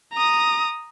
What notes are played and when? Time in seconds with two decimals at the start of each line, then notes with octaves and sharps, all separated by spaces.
0.13 A#5 D#6